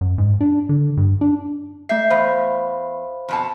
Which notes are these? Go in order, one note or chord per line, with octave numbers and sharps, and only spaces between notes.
F#2
G#2
D4
D3
G2
D4
A3 E5 G6 C7
E2 C5 F5 B5
F2 B2 A5